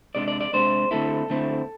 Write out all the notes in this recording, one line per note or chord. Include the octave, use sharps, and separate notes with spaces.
C3 G#3 D4 D5
D5
D5
C3 G#3 D4 C5
D3 A3 C4 E4 A4
D3 A3 C4 E4